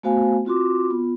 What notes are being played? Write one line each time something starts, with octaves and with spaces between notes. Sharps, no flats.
A3 B3 F#4 C5 F5 G#5
C4 F4 F#4 C6 D6
B3 F4